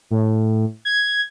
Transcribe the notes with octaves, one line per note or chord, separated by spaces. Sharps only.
A2
G#6